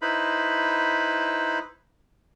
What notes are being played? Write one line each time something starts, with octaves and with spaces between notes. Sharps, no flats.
D#4 E4 B4 C5 B5